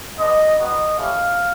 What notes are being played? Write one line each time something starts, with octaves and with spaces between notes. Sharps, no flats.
G#3 B3 D4 D#5
G3 B3 D#4 F#4 D#5
A3 C#4 E4 G4 F5